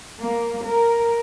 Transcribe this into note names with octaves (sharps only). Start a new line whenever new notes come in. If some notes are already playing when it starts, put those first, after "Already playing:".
A#3
A#4